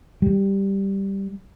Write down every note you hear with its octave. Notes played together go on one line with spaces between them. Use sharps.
G3